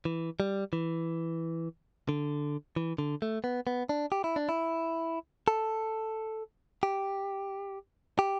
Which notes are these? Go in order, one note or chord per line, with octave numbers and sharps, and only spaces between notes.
E3
G3
E3
D3
E3
D3
A3
B3
B3
D4
G4
E4
D4
E4
A4
G4
G4